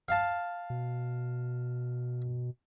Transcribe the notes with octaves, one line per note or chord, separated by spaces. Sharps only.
F5 A5
B2